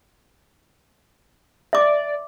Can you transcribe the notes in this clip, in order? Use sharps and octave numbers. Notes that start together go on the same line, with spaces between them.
D5 E5 D6